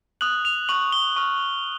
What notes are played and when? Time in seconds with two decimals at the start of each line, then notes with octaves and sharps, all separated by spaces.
0.21 D#6 F#6 F#7
0.45 F7
0.69 C#6 F#6 F#7
0.92 G7
1.16 C#6 F6